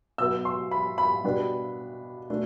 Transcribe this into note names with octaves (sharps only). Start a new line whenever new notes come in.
B2 F#3 B3 E6
C6
B5
B5
B2 G3 B3 D4
B2 A3 D4